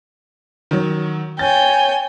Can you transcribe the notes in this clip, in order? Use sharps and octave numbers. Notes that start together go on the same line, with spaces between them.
D#3 F#3
C#5 G5 G#5 A6